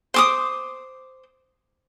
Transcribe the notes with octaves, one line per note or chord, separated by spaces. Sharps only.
C5 D6 D#6